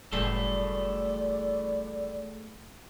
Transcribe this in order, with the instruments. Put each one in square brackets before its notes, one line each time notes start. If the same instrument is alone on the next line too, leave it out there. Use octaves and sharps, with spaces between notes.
[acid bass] F#1 [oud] A2 E3 G3 [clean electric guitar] A3 G#4 A4 [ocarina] D5